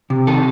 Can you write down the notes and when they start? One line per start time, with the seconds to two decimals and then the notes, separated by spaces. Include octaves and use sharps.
0.10 C3
0.27 D#3 A4